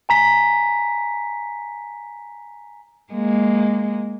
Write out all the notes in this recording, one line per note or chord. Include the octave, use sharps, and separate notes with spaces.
G#5 A#5 B6
G#3 A#3